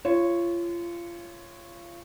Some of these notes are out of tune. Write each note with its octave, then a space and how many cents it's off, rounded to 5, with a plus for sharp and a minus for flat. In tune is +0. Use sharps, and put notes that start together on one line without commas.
F4 -30 C#5 -10